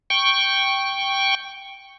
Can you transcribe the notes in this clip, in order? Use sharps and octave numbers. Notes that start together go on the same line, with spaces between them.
G5 C#6